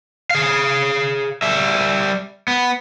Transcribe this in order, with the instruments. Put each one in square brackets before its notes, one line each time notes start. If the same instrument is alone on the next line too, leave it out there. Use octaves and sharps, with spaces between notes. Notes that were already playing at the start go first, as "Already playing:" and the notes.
[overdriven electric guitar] G#4 F5
G3 E5
B3